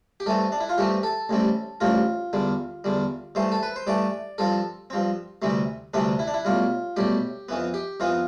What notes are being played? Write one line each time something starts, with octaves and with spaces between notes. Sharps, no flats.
G4
G2 E3 A3 C4 A4
D4
E4
F4
G2 E3 A3 C4 G4
A4
A1 A2 G3 C4
A1 A2 G3 C4 F4
E2 D3 G3
E2 D3 G3
G2 E3 A3 C5
A4
B4
C5
G2 E3 A3 D5
G2 F3 C4 A4
G2 F3 C4
D2 C3 E3 G3 C4
D2 C3 E3 G3 C4 D4
E4
D4
E4
B1 A2 G3 F4
B1 A2 G3 G4
F2 E3 B3
G4
F2 E3 B3 F4